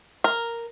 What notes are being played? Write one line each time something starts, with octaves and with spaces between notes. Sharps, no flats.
A#4